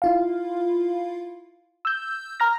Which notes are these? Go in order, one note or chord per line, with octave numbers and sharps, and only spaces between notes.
E4 F4 F5
E6 G6
A#5 F6 A#6